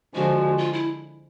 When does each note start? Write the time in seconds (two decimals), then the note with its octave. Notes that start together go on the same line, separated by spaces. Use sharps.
0.14 D3 F3 G#3 F#4
0.58 F4
0.73 E4